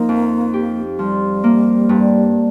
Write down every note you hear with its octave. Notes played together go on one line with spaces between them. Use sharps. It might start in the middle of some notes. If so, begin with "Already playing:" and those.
Already playing: F3 A#3 D#4
F2
G4
F3 G3
A#3
G2